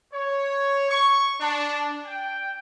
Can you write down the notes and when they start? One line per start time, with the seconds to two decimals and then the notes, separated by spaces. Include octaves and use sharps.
0.13 C#5
0.89 C#6
1.40 D4
2.06 G5